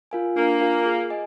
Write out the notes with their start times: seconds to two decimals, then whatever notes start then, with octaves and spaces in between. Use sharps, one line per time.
0.11 F4 A#4 F5 G#5
0.36 A#3 D4
0.61 F4 A#4 F5 G#5
0.86 G#4
1.10 D#5 G#5